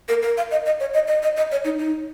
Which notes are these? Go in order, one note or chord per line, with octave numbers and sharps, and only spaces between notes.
A#4
A#4
F5
D#5
D#5
C#5
D#5
D#5
D#5
D#5
C#5
D#4
D#4